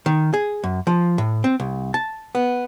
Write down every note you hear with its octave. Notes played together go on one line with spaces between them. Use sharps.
D#3
G#4
F#2
F3
A2
C4
C2
A5
B3